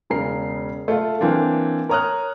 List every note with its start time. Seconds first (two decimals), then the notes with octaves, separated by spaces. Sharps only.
0.10 E1 C#3 A#4 C7
0.88 A3 F4
1.21 E3 A#3 C4 D4
1.89 A#4 C#5 A#5 D#6 F6 F#6